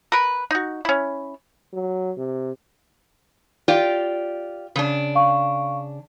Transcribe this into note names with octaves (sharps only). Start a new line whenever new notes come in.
A#4 B4
D#4 F#4
C#4 E4
F#3
C3
F4 G4 D5
C#3 D4
F5 C#6